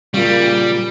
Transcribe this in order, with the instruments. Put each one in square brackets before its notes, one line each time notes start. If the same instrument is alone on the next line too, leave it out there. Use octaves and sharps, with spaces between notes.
[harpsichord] A#2 C#3 [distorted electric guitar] G3